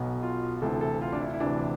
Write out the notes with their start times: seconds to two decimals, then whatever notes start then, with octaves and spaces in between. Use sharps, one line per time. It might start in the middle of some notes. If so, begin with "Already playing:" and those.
Already playing: B1 B2
0.23 F4
0.62 D2 C3 E3 A4
0.81 A4
1.02 F4
1.12 D4
1.21 E4
1.33 E4
1.40 D2 C3 E3 D4